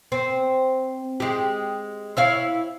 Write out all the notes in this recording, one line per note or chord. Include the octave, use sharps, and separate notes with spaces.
C4
G#3 G4
E4 C#5 F5